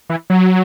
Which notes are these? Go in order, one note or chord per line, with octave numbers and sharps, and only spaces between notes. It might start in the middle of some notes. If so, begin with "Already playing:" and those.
E3
F#3